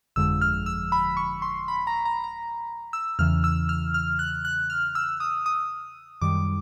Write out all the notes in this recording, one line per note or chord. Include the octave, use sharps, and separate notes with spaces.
G1 F2 D3 F3 G#3 E6
F6
E6
B5
C#6
C6
B5
A#5
A#5
A#5
E6
E2 C#3 E3 F6
E6
F6
F6
F#6
F#6
F6
E6
D#6
D#6
F#2 D#3 G3 D6